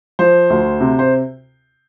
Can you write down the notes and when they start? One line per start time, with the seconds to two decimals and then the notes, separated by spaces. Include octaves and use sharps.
0.19 F3 C5
0.50 D2
0.81 C3
0.99 C5